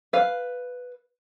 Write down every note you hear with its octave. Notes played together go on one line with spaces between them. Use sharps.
B4 F5